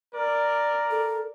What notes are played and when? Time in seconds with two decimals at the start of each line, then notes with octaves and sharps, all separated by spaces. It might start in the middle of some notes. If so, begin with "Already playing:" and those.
0.15 A#4 D5
0.91 A4